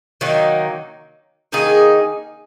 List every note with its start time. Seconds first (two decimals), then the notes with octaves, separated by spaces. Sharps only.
0.21 D#3 F#3 A#3 D#4
1.52 D#3 A#3 D#4 G#4